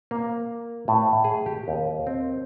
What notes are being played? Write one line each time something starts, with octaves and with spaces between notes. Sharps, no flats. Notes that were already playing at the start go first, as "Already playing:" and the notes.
A#3
A2
G#4
G4
D#2
C4